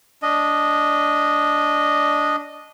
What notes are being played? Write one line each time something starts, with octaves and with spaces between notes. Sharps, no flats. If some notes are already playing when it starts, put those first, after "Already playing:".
D4 D#5